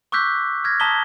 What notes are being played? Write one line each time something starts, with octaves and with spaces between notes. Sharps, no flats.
C#6 D6 E6 F#6 G6 B6
F6 G#6 A#6
A5 A#5 D#6 B6 G7